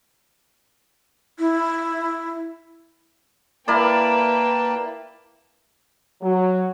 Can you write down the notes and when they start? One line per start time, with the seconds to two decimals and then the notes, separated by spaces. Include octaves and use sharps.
1.39 E4
3.68 A#3 E4 A#4 B4 D5 G5 A5
6.21 F#3